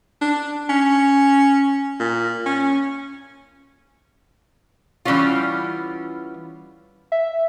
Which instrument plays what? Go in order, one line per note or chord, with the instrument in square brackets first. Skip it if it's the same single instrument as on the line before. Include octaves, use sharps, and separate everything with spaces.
[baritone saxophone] D4
C#4
A#2
C#4
[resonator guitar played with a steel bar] E3 G3 A3 B3 C#4 F4
[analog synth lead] E5